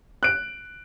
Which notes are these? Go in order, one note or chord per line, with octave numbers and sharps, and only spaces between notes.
F#6 D7